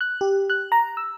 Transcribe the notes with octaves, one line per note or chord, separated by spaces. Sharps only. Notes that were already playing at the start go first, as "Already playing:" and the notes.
F#6
G4
F#6
A#5
E6